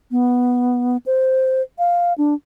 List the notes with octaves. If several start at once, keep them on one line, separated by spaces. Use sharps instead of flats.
B3
C5
F5
D4